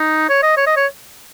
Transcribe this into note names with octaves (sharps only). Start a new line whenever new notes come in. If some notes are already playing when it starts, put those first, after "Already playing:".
Already playing: D#4
C#5
D#5
C#5
D#5
C#5